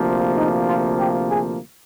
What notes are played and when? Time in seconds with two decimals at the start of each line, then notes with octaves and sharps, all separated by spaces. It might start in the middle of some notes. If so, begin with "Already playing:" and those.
Already playing: D2 C3 F3 A#3
0.35 D#4
0.65 F4
0.97 G4
1.27 G#4